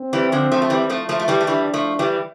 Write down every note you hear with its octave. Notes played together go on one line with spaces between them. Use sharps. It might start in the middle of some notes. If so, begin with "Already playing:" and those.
Already playing: C4
E3 G3
D3 F3
F3 A3
A3
E3 G3
F3 A3
F3 A3
A3
E3 G3
A3
E3 G3 D4
F3 A3
E3 G3